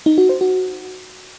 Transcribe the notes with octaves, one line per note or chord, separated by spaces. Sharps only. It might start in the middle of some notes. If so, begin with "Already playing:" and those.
D#4
F#4
C5
F#4